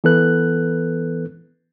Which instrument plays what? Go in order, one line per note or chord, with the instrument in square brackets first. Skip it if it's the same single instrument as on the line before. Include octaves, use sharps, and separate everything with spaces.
[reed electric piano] E3 B3 A4 B4 F#6